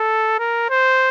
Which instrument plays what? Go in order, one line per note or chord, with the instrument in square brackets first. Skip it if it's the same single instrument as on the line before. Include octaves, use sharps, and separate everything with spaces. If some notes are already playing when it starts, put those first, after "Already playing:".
Already playing: [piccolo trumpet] A4
A#4
C5